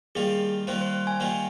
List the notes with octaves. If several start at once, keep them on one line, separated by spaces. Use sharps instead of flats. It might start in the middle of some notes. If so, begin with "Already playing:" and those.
D#3 G3 A#3 F4 G#4
D#3 G3 A#3 F4 C5
C5
G#5
D#3 G3 A#3 F4 G5